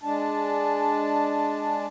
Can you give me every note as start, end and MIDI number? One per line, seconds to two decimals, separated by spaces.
0.03 1.86 56
0.03 1.86 62
0.03 1.86 81